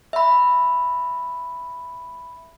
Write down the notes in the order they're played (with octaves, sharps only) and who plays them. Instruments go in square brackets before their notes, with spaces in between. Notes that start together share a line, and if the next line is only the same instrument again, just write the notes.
[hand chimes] E5 B5